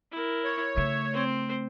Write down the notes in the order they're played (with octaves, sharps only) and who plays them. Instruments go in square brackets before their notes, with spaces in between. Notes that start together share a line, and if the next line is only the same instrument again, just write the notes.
[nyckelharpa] E4 A#4
[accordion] C#5
[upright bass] C#3 A3 [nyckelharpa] E5
[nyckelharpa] C4 C5